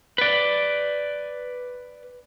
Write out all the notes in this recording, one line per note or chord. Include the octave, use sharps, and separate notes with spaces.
B4 D5